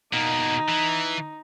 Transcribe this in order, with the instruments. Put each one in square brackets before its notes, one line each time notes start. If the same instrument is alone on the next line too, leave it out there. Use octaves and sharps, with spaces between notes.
[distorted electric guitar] B2 A#3 [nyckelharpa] D#4
[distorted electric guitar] E3